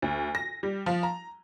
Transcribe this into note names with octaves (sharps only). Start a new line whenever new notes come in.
D2
A#6
G3
F3
A#5